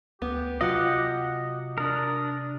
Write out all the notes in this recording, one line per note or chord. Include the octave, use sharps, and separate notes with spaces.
D2 B3 G4
C3 F#3 F4 F#4 D#5 F#5
D4 A#4 D#6